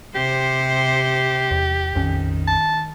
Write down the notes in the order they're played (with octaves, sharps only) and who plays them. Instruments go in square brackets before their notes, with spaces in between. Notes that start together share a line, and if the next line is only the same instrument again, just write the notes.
[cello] C3 C5 [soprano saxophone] G4
[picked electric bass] E2
[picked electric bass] A#1 F2 C#4 [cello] D#3
[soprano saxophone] A5